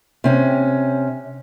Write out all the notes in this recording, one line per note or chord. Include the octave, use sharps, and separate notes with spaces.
C3 C#4